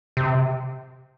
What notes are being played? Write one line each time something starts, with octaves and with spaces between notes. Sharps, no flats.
C3